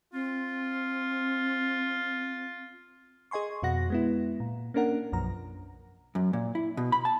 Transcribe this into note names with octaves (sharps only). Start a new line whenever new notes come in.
C4 F4
G#4 D#5 G#5 C6 C#6
F2 B2 F#4 F#5 A#6
G#3 B3 E4
A#2
A#3 C#4 D4 A#4 F#5
B1 F#2 F3 A#5
F#2
A#2
E4
B2
B5
A5